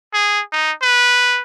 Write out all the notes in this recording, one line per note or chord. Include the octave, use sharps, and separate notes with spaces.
G#4
D#4
B4